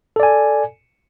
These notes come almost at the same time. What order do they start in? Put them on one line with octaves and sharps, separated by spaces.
A4 D5 G#5